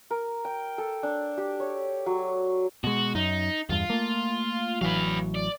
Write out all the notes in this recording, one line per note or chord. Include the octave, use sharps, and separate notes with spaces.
A#4
G5
A4
D4
G4
C#5
F#3
B2 G#3 F#4
F#2 D#4
E2 G2 F4
A3 A#3
A1 E3 F#3 B4 F5
D5